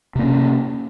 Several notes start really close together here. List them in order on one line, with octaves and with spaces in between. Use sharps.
C3 A#3 C#4